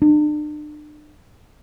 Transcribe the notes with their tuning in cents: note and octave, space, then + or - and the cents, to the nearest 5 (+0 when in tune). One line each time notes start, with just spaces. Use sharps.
D4 +40